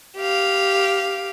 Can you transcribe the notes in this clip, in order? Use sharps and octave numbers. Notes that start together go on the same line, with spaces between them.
G4 F5